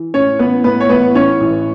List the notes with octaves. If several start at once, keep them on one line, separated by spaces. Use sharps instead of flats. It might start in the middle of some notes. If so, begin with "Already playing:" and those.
Already playing: E3
A2 C#4 C#5
E3 B3 B4
A2 B3 B4
C#5
A1 B3 B4
E3 C#4 C#5
A1